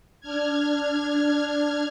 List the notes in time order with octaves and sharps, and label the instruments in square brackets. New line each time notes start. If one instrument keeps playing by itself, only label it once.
[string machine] D4 F6 G#6